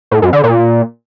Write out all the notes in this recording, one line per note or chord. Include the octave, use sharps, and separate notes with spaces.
A2
F#2
D3
A#2